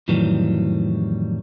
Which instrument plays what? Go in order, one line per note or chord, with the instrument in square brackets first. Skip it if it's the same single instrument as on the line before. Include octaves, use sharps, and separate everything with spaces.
[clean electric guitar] F2 A2 D#3 E3 F#3 G3